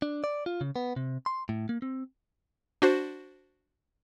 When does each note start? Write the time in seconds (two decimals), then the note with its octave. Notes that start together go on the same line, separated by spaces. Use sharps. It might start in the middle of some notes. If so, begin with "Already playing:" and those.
0.02 D4
0.24 D5
0.46 F4
0.61 C#3
0.76 B3
0.96 C3
1.26 C6
1.49 A2
1.69 A#3
1.82 C4
2.82 D4 F#4 C5